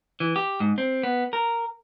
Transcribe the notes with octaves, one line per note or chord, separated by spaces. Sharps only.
E3
G4
G#2
C4
B3
A#4